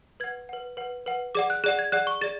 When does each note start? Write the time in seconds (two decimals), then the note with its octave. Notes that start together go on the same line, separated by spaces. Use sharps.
0.20 B4 F#5 G#6
0.49 B4 F#5
0.77 B4 F#5
1.06 B4 F#5
1.35 G#4 D5 F#5 D6
1.50 F#6
1.64 G#4 F#6
1.66 D5 F#5
1.79 G#6
1.92 G#4 D5 F#5 F#6
2.07 C#6
2.21 G#4 D5 A6